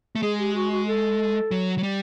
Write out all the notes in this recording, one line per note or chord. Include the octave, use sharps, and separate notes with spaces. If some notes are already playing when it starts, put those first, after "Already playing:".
A3
G#3 G#4
G4
F#4
F#4
A4
F#3
F#3
G3